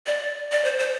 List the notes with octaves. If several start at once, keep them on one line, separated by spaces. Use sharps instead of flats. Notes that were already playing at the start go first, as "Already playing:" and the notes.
D5
D5
C5
C5